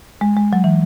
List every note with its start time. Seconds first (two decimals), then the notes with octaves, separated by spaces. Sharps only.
0.21 G#3
0.37 G#3
0.53 F#3
0.64 E3